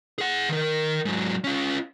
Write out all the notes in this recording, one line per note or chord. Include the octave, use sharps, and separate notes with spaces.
G#4 F#5
D#3 A#4
G#2 F#3
C#4 F4